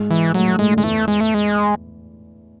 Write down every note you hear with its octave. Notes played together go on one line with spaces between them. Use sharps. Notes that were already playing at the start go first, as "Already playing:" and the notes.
Already playing: G#2 G#3
E3
A2 F#3 A3
A2 A3
A2 G#3 A3
D3
G#3
E2 E3 A3
G#3
A3
G#3